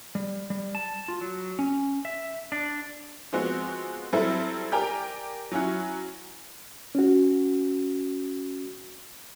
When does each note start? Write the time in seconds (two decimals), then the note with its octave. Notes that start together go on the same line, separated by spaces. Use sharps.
0.15 G3
0.50 G3
0.75 A5
1.08 F4
1.21 F#3
1.59 C#4
2.05 E5
2.52 D4
3.32 F3 G#3 B3 C4 F#4
4.13 F#3 G3 C4 E4 A4 E5
4.72 G4 A#4 D5 G5 G#5 A#5
5.51 F#3 C#4 E4 F#4
6.95 C#4 F#4